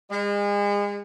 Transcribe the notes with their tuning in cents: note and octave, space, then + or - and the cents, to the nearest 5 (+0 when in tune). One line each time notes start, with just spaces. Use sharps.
G#3 -35